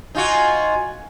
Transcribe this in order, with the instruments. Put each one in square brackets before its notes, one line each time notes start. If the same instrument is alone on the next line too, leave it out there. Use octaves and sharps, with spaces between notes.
[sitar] D#4 F4 F#4 [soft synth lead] G#5